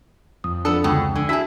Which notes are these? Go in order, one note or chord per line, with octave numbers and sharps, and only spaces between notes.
F2 D#6
F3 B3 D4 A4 D#6
C#2 B2 D3 G5 D#6
D3 G#5
E4 F#4 G#4 A5 E6 B6